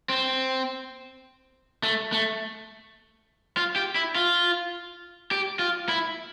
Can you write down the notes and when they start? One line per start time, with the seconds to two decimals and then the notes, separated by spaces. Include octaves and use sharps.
0.09 C4
1.83 A3
2.12 A3
3.57 F4
3.76 G4
3.96 E4
4.15 F4
5.31 G4
5.59 F4
5.89 E4